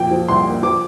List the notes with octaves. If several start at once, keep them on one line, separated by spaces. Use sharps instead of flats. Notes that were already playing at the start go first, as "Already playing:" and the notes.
Already playing: F2 A#2 G5
F3
C2 C6
A#3
F3 D6